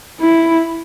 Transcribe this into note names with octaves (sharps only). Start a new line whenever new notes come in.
E4